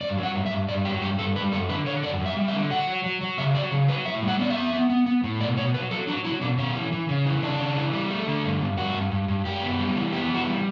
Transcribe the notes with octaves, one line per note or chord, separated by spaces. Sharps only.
G2 D5
F#3
F#5
G2
E5
G2
G2 D5
F#3 G4
G2 G4
G2 A4
G3 B4
F#2 A4
D3 B4
D3 C#5
F#2 D5
F#2
E5
G3
E5
D3
F#3 F#5
F#3
F#3
F#3
C#3 E5
F#3 D5
C#3
F#3 B4
A2 E5
G3
F#5
B3 D5
E5
B3
B3
B3
B3
A2
B2 D5
B2 C#5
F#3 B4
F#3 A4
F#3 D4
F#3 E4
B2 D4
B2 C#4
E3
E3
C#3
E3
C#3 D4
C#3
E3
G3
A3
D3
G2
G2
G2 F#4
G2
G2
G2
F#2 G4
B3
G3
E3
B3 G4
E3 F#4
G3